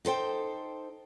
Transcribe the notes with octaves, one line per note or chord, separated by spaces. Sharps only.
D#4 A4 C5 G5